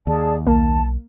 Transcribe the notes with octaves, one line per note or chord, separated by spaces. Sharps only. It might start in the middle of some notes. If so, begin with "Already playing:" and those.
D#2 G#4 D5 A5
B1 A#3 A5